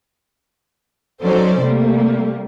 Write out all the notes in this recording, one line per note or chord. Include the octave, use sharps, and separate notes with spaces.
F#3 C#4 D#4 A4 C5 D5
C3 G3 A3 A#3